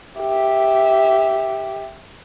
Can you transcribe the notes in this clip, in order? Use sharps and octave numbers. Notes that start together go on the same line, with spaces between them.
G4 E5